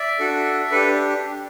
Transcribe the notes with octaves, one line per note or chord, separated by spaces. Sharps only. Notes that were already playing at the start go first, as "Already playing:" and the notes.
Already playing: D5 E5
D4 F#4 A4
D4 G4 A4 B4